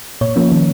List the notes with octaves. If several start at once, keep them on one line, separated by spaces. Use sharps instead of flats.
A#2 C#5
F3 A#3 C#4
D#3